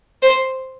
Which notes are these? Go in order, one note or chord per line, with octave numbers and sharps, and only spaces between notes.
C5